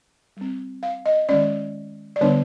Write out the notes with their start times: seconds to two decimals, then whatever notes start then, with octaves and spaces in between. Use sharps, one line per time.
0.37 G3 C4
0.83 F5
1.06 D#5
1.29 D#3 G#3 C#4 D5
2.16 D5
2.21 D3 G3 B3 D4 C#5